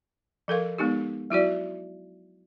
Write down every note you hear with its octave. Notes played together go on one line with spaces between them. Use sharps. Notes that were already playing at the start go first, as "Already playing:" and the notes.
F3 A4 A#4 F5
G#3 B3 D#4 G4
F#3 E4 F#4 D5